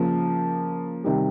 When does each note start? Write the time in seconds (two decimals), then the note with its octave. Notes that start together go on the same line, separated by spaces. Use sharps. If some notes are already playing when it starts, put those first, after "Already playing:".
Already playing: C#3 F3 A#3
1.04 C3 D#3 G3